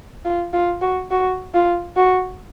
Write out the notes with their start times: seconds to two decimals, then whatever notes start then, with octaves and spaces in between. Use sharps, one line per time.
0.25 F4
0.53 F4
0.81 F#4
1.11 F#4
1.54 F4
1.97 F#4